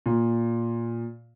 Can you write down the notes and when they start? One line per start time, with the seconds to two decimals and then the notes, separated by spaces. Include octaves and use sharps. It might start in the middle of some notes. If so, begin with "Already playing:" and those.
0.06 A#2